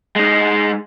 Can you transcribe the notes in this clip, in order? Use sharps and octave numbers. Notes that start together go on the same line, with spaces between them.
G#3 D#4